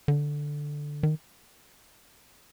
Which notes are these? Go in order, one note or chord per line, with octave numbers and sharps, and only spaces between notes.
D3
D#3